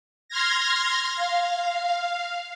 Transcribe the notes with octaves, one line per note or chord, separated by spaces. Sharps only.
C6 F6 G#6 A#6
F5